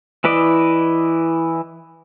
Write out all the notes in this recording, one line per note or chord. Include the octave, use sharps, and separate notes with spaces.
E3 E4 B4 D5 D#5